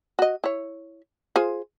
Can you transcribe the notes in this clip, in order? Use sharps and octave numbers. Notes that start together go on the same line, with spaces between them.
F#4 D#5
E4 C#5
F4 G#4 C5